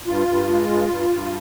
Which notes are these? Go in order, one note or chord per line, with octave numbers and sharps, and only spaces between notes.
G2 F4
G2
G#3
G2
G2
G2